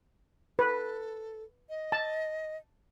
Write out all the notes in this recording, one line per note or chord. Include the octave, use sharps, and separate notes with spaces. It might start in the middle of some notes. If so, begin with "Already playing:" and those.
A4 B4
D#5
A5